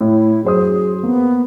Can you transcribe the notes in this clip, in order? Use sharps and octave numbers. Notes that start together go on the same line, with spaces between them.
A2 E4
F#2 G#4 C5 D#6
A#3 B3